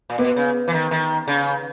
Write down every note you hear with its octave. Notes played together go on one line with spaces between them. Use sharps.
A#2
B2 B3
C#3
E3
D#3
D#3
C#3